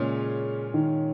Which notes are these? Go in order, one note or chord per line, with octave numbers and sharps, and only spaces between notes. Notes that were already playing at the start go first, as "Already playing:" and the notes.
Already playing: A#2 C#3 G#3 C#4 F4
D#3